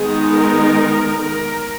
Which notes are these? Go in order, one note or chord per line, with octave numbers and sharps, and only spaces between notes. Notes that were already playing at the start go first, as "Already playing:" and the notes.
Already playing: D#3 G#3 B3 D#4 G#4
A#4
A#4